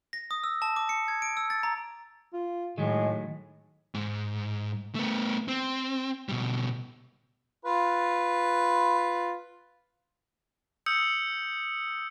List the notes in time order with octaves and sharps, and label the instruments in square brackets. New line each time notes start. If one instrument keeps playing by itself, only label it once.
[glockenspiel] A#6
D#6
E6
A5
D6
C#7
G#6
D7
E6
A6
A#5
[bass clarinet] F4
[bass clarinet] A2 [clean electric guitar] D#3 F#3 A3 [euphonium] G#3
[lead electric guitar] G#2
A3 B3
C4
B2 G3
[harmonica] F4 B4
[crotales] D#6 E6 G6 C#7